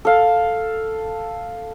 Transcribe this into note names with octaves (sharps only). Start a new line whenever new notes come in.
A4 F5